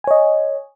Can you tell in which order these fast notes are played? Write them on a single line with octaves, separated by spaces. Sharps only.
G#5 C#5 D#5